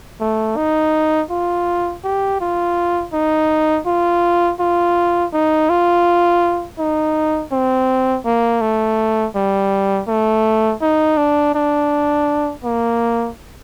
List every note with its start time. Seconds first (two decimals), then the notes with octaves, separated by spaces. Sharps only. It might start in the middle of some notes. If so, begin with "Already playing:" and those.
0.20 A3
0.57 D#4
1.30 F4
2.04 G4
2.41 F4
3.13 D#4
3.86 F4
4.60 F4
5.33 D#4
5.69 F4
6.79 D#4
7.52 C4
8.25 A#3
8.61 A3
9.36 G3
10.08 A3
10.82 D#4
11.17 D4
11.55 D4
12.64 A#3